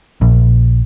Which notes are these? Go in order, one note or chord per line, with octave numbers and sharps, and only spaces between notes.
A#1